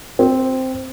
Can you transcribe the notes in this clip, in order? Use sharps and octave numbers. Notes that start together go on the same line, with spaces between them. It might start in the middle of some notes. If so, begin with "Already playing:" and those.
C4